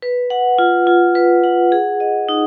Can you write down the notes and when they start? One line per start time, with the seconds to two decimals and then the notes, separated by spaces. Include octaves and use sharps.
0.02 B4
0.30 F#5
0.58 F4
0.87 F4
1.15 B4
1.44 F#5
1.72 G#4
2.00 D#5
2.29 D#4